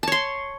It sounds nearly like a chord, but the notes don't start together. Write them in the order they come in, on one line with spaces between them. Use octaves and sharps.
A5 C#5 C6